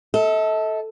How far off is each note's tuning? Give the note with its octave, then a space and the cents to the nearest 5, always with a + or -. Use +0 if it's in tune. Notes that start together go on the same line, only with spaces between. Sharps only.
A4 +0 E5 -45